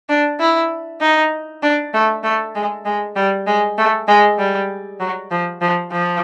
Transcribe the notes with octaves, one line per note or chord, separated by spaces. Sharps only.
D4
E4
D#4
D4
A3
A3
G#3
G#3
G3
G#3
A3
G#3
G3
F#3
F3
F3
F3